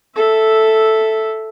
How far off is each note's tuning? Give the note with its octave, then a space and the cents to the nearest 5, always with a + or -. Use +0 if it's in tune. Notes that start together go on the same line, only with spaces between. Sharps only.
A4 +0 E5 +0